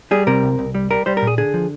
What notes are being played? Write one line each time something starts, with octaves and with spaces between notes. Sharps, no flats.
G3 G#4
C3 A#4
C2
C2
G3
G3 A#4
G3 C5
A#4
A#2
G#4
D3 G#4
F3